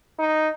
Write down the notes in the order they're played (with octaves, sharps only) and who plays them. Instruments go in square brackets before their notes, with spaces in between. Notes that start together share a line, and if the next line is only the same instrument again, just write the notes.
[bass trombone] D#4